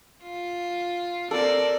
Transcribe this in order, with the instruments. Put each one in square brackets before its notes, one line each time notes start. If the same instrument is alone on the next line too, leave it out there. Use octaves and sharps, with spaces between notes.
[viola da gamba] F4
[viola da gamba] C4 A#4 D5 [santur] A4